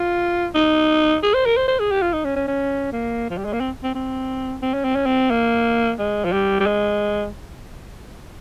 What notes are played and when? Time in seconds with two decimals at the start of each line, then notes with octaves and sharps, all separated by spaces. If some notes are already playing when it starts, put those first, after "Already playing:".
Already playing: F4
0.55 D#4
1.23 G#4
1.34 C5
1.46 A#4
1.57 C5
1.68 C5
1.80 G#4
1.91 G4
2.02 F4
2.13 D#4
2.25 C#4
2.36 C#4
2.48 C#4
2.92 A#3
3.30 F3
3.38 G3
3.45 G#3
3.53 A#3
3.60 C4
3.83 C4
3.95 C4
4.62 C4
4.74 C#4
4.85 C4
4.95 C#4
5.06 C4
5.31 A#3
5.99 G#3
6.25 F3
6.32 G3
6.60 G3
6.66 G#3